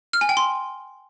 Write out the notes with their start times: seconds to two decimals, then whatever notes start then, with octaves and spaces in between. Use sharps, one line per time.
0.13 F6
0.21 G#5
0.29 G5
0.37 C6